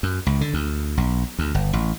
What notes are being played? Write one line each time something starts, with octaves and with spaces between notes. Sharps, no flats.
F#2
C#2
D3
D2
B1
D2
G1
A1